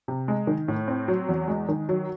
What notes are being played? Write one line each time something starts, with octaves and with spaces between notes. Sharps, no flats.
C3
G#3
D#3
A2
C4
F#3
E2
G#3
D#3
F#3